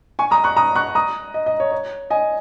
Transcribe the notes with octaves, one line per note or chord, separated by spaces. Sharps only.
G#5 C#6
A#5 D#6
C#6 F#6
A#5 D#6
C#6 F#6
A#5 D#6
D#5
D#5
C#5
C#5
D#5 G#5